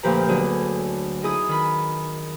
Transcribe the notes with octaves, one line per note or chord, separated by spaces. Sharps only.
D2 A#2 F3 G4 B4 A#5
D3 F#3 B3 F#4 G#4
D#4 E4 G#4 D#6
D#3 B5